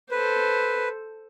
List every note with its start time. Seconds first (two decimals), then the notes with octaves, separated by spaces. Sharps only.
0.11 A4 B4 C5